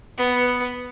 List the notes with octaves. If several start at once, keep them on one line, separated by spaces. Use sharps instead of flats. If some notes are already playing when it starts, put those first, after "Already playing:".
B3